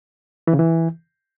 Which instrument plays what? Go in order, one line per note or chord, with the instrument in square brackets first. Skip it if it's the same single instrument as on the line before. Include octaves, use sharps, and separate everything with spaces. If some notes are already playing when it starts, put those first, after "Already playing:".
[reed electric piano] E3
C#3
E3